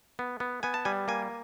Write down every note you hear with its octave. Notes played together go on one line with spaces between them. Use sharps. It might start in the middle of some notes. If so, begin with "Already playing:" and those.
B3
B3
B3 G#5
A5
G3 G#5
A#3 G#5